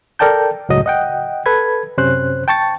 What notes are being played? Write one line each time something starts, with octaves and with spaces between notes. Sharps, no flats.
A4 A#4 D5 G5 A5 G6
C#2 F#2 A2 C#3 F#3 D#5
D#5 F#5 G5
A4 B4 B5 G#6
F#2 C3 C#4 C5 F#6
G5 A5 C#6 A6